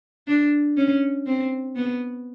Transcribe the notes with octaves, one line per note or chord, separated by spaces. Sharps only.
D4
C#4
C4
B3